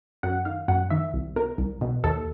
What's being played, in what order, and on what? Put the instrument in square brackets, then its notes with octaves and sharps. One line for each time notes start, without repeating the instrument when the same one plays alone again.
[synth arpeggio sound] F#2 F#5
D#3 F5
F#2 F#5
D#3 E5
C2
B2 A#4
C2
B2
D#2 A4